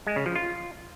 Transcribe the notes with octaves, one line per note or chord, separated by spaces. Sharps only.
G#3
C#3
F3
F4